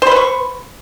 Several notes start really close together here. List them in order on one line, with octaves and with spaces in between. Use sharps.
C5 B5 B4 C#6